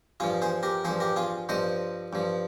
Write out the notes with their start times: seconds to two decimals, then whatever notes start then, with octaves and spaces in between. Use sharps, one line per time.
0.20 G2 F3 F4 G#4
0.42 G#4 C5
0.63 G4 A#4
0.84 G2 F3 G#4 C5
1.00 G4 A#4
1.16 F4 G#4
1.49 G2 F3 C5 D#5
2.13 G2 F3